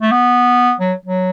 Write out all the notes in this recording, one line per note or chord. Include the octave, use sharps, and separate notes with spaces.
A3
B3
F#3
F#3